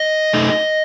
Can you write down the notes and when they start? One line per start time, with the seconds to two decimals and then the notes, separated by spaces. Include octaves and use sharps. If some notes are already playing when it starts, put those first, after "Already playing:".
Already playing: D#5
0.33 A3 D#4